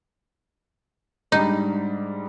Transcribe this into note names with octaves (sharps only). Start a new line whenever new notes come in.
G#2 G3 D4 D#4